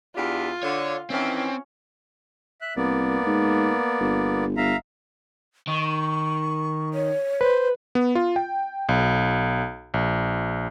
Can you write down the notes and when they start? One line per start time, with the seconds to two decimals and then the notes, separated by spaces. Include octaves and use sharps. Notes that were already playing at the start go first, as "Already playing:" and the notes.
0.16 E2 D4 F4 G4
0.63 D3 C#5
1.10 D#3 E3 C4 C#4
2.61 E5 F#6
2.76 C2 A#3 B3 D5
3.26 G#2
4.00 G1
4.57 G1 E5 F5 A#5
5.67 D#3 C#6
6.94 C#5
7.41 B4 C5
7.95 B3
8.15 F4
8.36 G5
8.89 B1
9.94 A#1